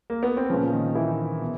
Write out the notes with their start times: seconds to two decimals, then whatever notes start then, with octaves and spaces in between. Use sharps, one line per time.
0.10 A#3
0.23 B3
0.37 C4
0.50 A#2 C#3 F3 C#4
0.72 D#3 D#4
0.95 E3 E4
1.42 B2